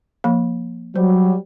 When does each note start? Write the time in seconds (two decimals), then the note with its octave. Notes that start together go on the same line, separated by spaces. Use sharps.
0.24 F3 A#3 B5
0.96 F#3 G3 C5